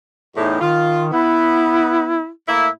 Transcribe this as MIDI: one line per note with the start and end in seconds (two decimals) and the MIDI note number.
0.36 0.60 40
0.36 0.60 45
0.36 0.59 63
0.61 1.09 51
0.61 1.03 65
1.12 2.18 59
1.12 2.29 64
2.48 2.68 45
2.48 2.68 58
2.48 2.68 64